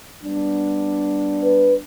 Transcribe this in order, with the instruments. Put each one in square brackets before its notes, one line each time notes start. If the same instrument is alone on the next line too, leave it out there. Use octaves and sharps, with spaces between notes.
[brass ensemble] G3 B3 D4
[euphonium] B4